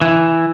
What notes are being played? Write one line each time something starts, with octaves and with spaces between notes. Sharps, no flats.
E3